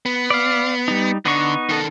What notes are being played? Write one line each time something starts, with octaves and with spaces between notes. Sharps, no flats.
B3
D5 F5
G3 D#4
D3 B3 D#4 C#6
D#3 A4